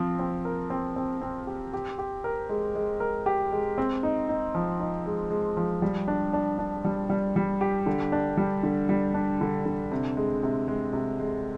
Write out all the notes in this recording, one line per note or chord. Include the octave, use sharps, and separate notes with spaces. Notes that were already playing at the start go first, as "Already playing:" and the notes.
Already playing: F3 C4
C4
A#4
C4
C4
C4
G4
G4
G4
A#4
G#3
G#3
A#4
G4
G#3
C4
D#4
D#4
F3
D#4
G#3
G#3
F3
G3
D4
D4
D4
G3
G3
G3
G4
D3
D4
G3
D3
G3
D4
D3
D3
C3
G#3
C3
G#3
C3
G#3